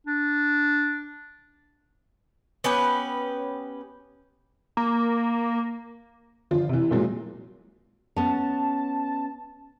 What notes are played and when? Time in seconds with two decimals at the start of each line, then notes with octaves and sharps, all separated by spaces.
0.07 D4
2.64 B3 C#4 G4 B4
4.77 A#3
6.51 G1 F3 F4
6.69 C3 E3
6.91 A#2 F3 F#3 G#3 A#3
8.16 B3 C#4 A5